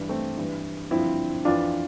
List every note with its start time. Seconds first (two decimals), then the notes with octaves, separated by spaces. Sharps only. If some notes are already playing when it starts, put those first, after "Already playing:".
Already playing: G2 E3
0.09 A3 C4
0.37 G2 E3
0.91 G2 D3 F3 C4 E4
1.45 F2 E3 D4 F4